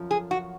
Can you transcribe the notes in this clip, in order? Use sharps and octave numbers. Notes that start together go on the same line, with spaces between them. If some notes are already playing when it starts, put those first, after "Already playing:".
Already playing: F#2 F3
G#4
F#4